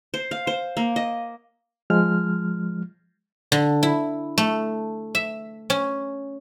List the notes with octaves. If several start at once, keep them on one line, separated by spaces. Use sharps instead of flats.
C5
F5
C5
A#3
D#5
F3 G#3 F6
D3
E4
A3
E5
C#4